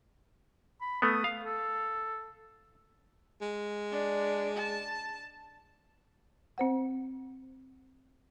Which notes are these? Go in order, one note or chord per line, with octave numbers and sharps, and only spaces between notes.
B5
A3 B3 D#6
F5
A4
G#3
D4
A5
C4 C5 F#5